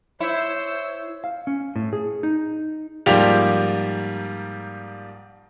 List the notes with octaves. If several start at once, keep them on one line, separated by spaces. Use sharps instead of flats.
E4 C5 C#5 E6
F5
C#4
A2
G#4
D#4
G#2 F3 G3 A#3 G4 F7